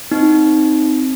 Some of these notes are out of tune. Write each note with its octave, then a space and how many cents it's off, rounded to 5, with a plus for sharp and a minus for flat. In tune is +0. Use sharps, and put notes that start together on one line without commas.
C4 +0 D#4 +0